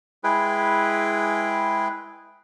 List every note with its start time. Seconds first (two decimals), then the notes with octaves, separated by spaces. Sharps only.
0.24 G#3 E4 G#4 B4 G5